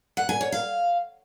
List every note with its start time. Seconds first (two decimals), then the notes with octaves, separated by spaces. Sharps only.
0.17 F#5
0.29 G#5
0.41 C#5
0.52 F5